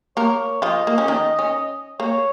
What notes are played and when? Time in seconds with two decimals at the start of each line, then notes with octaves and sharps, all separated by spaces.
0.17 A#3 A#4 C#5
0.62 F3 F4 D#5
0.87 A#3
0.98 C#4
1.08 D#3 D#4
1.39 C#4
2.00 A#3 C#5